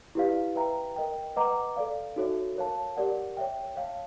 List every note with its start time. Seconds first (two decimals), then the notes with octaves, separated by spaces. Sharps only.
0.15 E4 G4 B4 D5 F5
0.55 B4 E5 G5 A#5
0.96 A#4 D#5 G5
1.36 B4 D#5 F#5 A#5 D6
1.76 A4 D5 F5
2.16 D#4 F#4 A4 C#5 E5
2.56 A#4 C#5 F5 A5
2.96 G4 A#4 D5 F#5
3.37 C#5 E5 G5
3.76 C#5 F5 A5